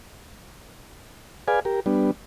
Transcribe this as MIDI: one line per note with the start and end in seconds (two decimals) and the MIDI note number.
1.48 1.60 68
1.48 1.60 71
1.48 1.60 74
1.48 1.60 77
1.48 1.60 80
1.65 1.80 67
1.65 1.80 70
1.86 2.11 55
1.86 2.11 59
1.86 2.11 62